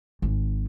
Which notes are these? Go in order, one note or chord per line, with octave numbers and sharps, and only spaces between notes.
G#1